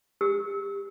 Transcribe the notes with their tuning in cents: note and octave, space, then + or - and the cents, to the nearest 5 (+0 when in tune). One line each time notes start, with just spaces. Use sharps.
G4 +20 E6 -30